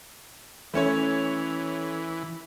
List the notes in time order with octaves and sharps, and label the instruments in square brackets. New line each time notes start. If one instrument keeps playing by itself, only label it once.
[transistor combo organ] E3 [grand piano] A3 C#4 C#5